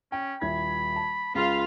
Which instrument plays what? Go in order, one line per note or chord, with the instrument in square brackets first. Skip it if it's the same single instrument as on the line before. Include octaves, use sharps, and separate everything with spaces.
[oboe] C#4 [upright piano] G5
[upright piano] D#1 E4 G#6 [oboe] B5
[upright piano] A5
[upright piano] C#2 [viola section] F4 F5 [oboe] B5